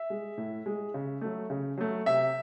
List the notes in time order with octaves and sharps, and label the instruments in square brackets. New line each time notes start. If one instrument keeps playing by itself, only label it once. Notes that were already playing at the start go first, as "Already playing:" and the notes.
Already playing: [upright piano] E5
G#3
A2
G#3
C#3
F#3 A3
C#3
F#3 A3
C3 E5